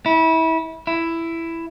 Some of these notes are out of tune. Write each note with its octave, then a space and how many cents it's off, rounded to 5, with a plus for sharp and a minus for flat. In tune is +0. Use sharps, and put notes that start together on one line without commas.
E4 -25
E4 +10